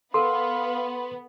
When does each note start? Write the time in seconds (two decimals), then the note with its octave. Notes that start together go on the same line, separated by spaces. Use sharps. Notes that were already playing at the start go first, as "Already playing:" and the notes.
0.14 B3 A4 A#4 F5 C6